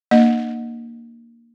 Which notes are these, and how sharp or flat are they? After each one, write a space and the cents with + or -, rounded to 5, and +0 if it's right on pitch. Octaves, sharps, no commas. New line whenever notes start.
A#3 +0 D4 +40 D#5 +0